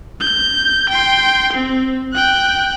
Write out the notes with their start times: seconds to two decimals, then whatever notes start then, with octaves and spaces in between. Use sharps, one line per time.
0.21 G6
0.90 G5 C6
1.53 C4
2.14 G5 F#6